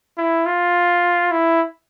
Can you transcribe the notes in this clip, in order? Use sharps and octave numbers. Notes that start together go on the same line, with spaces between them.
E4
F4
E4